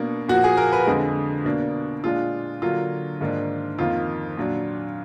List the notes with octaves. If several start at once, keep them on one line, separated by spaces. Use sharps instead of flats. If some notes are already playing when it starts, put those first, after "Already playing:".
Already playing: B2 A#3 D4
A#2 F3 A#3 F#4
G#4
A#4
B4
F2 D3 G#3
B2 A#3 D4
A#2 G#3 D4 F4
D3 F#3 A#3 D4 F4
G#2 D#3 A#3 D4
F2 D#3 A#3 F4
A#2 F#3 D4